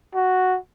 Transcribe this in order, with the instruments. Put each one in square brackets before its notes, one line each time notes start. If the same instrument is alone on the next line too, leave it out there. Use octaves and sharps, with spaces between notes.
[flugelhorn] F#4